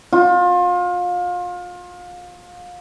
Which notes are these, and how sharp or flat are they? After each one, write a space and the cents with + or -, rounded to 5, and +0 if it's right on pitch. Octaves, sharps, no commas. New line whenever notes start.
F4 +30